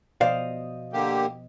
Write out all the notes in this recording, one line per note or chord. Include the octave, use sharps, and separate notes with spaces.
B2 F3 C5 D5 D#5 F5
D3 A#3 G4